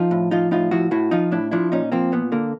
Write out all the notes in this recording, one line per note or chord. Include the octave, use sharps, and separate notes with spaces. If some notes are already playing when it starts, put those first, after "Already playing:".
Already playing: F3 D#4 F4
A2
F3 D#4 F4
A2 D#4 F4
F3 E4 F#4
A2 E4 F#4
F3 D#4 F4
A2 D4 E4
F3 D4 E4
A#2 C#4 D#4
F3 A#3 C4
A#2 B3
D3 A#3